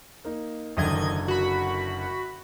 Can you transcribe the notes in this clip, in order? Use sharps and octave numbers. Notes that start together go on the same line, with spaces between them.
A#3 D#4
F#1 F#2 D3 D#3 D#5 G#6
F#4 B5